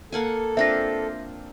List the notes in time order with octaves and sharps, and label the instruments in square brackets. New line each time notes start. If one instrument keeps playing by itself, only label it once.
[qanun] A#3 F#5 G#5 [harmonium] A4
[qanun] C4 D4 F4 [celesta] E5 A#6